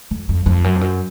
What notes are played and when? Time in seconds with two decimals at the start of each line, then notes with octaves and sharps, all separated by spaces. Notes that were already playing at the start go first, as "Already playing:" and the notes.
0.11 F2
0.29 F2
0.46 F2
0.64 F#2
0.75 F2
0.81 F#2